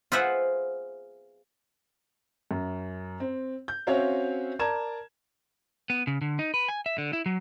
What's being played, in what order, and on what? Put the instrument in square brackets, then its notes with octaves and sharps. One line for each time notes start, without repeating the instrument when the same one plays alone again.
[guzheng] F4 G#4 B4 C5 E5 F#5
[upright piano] F#2
C4
G6
C4 C#4 F#4 C#5 E5 F5
A#4 D5 A5 A#5 G#6 E7
[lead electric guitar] B3
C#3
D3
D#4
B4
G#5
E5
D3
E4
F#3